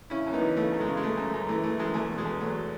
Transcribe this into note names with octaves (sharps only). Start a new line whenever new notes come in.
C#3 C#4 E4
F#2
B3 D#4
E3
C#3 A3
F#2
G#3
C#3
G#3
C#3 A3
F#2
F#2
E3 A3
E3 A3
F#2 G#3
E2 A3
B2
G#3
E2
F#3 A3